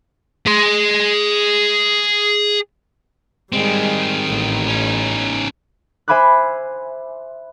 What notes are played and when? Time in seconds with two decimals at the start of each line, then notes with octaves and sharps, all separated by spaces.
0.46 G#4 C6
3.53 D#3 G3 G#3 C4
4.29 A1
4.68 C#4 D#4
6.08 C5 E5 G#5 B5 D6 F#6